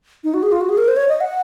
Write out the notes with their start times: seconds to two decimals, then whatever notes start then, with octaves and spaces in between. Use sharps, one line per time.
0.24 D#4
0.34 F#4
0.43 G#4
0.52 F4
0.61 F#4
0.69 G#4
0.78 A#4
0.88 C5
0.96 C#5
1.09 D#5
1.21 F#5